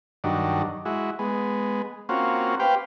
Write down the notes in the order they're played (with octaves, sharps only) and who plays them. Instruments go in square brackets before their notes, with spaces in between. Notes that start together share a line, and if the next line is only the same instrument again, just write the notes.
[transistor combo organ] G2 D#3 F#3 D4
G#3 E4 F#4
G#3 B3
A#3 C4 C#4 F4 F#4
G4 B4 C5 F5 G5